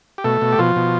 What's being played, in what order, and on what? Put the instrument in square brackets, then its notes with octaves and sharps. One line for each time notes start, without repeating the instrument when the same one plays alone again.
[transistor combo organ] G4
B2 A3 A4
B2
G4
B2 F3 F4
B2